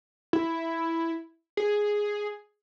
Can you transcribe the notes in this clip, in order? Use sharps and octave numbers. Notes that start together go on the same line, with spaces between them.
E4
G#4